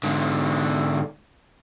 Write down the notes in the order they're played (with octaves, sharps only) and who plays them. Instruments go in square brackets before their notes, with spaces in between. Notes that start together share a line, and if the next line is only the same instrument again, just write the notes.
[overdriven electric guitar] G#2 D3